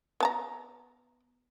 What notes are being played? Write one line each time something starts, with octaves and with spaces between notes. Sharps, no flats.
B3 A5 A#5